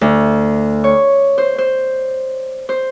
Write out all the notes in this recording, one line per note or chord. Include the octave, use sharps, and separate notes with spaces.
D2
C#5
C5
C5
C5